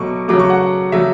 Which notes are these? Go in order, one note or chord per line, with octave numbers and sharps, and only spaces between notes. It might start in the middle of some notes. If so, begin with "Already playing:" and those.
Already playing: B2 F#3 A3 C#6 D6
C#3 F#3 A3 D6
C#6
F#5
C#3 F#3 A3 E5